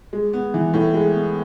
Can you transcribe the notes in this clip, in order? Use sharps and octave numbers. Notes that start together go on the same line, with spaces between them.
G#3
B3
E3
A2
G#3
B3